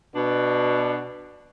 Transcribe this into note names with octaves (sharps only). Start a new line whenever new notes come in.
B2 D4